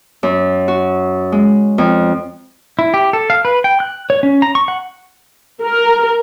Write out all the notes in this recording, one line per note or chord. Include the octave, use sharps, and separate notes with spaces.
F#2
F#4
G#3
F2
E4
G4
A4
F5
B4
G5
F#6
C#5
C#4
A#5
C#6
F#5
A#4